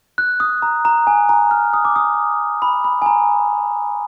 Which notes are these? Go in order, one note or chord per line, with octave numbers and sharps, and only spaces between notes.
F#6
D#6
A#5
A#5
G#5
A#5
F6
D#6
D6
D#6
B5
B5
G#5
A#5